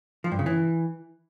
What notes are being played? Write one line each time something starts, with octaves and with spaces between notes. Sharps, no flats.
F3
G2
C#3
E3